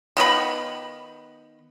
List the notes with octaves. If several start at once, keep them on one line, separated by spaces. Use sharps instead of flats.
D#3 B3 G4 B5